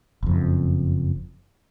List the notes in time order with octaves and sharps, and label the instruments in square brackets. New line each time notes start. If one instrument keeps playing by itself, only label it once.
[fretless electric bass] F#1 F2